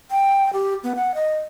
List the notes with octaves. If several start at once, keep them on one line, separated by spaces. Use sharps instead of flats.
G5
G4
B3
F#5
D#5